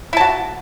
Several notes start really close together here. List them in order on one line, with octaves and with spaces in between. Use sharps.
E4 A5 F#4